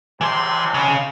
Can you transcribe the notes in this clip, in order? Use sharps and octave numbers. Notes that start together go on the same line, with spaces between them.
G#1 C#2 C3 E3 C6
C#3